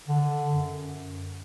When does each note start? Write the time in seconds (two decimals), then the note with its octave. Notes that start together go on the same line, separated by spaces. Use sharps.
0.08 D3
0.52 F#2